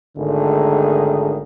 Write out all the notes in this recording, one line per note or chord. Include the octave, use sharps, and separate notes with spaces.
G#1 G#2 D3 D#3 A3 G#4